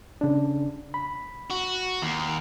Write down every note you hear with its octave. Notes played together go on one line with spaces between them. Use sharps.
C#3 D4
B5
F#4
D#2